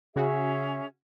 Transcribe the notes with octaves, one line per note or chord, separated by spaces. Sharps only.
C#3 C#4 F#4 G#4 E5